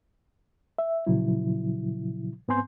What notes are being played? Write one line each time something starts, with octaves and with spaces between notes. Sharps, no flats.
E5
A#2 C#3 F3 F#3 E4
G#2 B3 C4 G#5 C6 G6